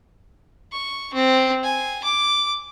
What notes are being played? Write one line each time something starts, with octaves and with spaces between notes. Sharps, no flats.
C#6
C4
G#5
D6